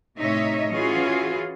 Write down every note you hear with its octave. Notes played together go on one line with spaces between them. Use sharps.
A2 C3 D#4 C#5 D#5 E5
E3 C#4 F4 F#4 G#4